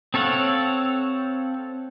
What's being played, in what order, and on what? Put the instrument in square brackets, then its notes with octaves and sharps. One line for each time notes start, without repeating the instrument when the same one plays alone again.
[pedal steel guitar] C4 A4 C#5 F5 F#5